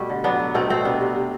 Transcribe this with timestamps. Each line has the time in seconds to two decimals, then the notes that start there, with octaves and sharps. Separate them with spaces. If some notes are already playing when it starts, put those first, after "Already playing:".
Already playing: B2 G3 A3
0.10 D3
0.24 F#3 B3 D4
0.39 F#3
0.54 B2 A3 C4
0.70 B2 A3 C4
0.85 C3 B3 D4
1.01 C3
1.16 C3